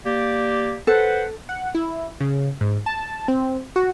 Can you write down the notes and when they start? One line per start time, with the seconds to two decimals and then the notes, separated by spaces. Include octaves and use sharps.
0.05 A#3 G4 D5
0.87 A4 B4 C5 F#5
1.49 F#5
1.75 E4
2.20 C#3
2.61 G#2
2.86 A5
3.28 C4
3.76 F#4